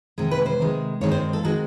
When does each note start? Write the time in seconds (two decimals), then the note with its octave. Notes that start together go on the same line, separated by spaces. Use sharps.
0.18 C3 D#3 G#3
0.31 B4
0.46 C5
0.59 C3 D#3 G#3
1.01 G2 D#3 G#3 C4 C#5
1.12 C5
1.33 A4
1.43 D#3 G#3 C4 F#4